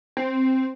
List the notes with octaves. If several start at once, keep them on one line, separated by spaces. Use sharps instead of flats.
C4